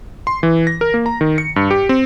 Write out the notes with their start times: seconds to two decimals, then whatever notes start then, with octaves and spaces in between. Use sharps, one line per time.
0.27 C6
0.43 E3
0.67 A#6
0.81 A#4
0.94 A#3
1.06 A#5
1.21 D#3
1.38 C#7
1.56 G2
1.71 G4
1.89 C4